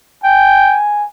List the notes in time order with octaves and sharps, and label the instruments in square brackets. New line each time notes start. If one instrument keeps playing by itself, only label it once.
[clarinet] G5 [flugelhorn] G#5